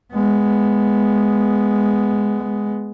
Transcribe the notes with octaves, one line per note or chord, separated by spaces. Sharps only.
G#3 B3